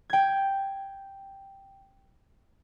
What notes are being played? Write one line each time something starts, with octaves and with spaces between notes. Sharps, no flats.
G5 G#6